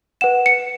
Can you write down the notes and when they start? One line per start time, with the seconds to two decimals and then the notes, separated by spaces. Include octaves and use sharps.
0.21 B4 F#5 E7
0.46 C#7